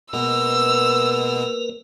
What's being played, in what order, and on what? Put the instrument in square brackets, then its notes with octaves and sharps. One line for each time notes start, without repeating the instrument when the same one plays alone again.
[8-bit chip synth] B2 G#3 B3 [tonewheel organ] A#3 A#4 B4 [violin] E6